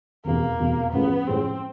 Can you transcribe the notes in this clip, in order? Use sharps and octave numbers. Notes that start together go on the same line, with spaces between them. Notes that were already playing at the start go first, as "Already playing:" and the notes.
F1 E2 B2 A#3
F1 E2 B2
A1 A2 F3 G#3 B3
A1 A2 F3 G#3 C4